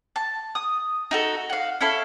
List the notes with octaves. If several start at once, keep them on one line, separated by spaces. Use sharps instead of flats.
A5
D#6
D#4 F#4 A4
F5 F#5
C#4 E4 A4 F5